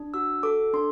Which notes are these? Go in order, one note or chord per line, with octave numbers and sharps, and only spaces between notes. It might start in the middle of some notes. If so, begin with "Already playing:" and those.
Already playing: D4
F#4 E6
A4 D6
D4 C6